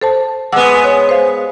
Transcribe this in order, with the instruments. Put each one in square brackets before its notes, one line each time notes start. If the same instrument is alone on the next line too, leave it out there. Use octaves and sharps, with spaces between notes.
[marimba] A4 C5 A5
[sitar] G#3 B3 [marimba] F#5 D6 E6
[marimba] C#5
C5 F5